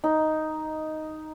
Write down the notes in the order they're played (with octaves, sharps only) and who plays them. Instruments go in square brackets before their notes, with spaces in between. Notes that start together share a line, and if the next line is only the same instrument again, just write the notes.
[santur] D#4